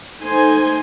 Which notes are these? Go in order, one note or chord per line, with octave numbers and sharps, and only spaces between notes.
A3 D#4 C5 G#5 C6